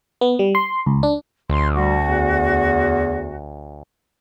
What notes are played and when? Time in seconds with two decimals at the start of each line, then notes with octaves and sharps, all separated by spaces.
0.21 B3
0.39 G3
0.55 C6
0.86 C#2
1.03 D4
1.50 D2 C6
1.75 G3 F#4
2.05 E2